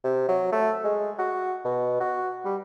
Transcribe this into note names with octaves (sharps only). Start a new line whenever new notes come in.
C3
F#3
A3
G#3
F#4
B2
F#4
G3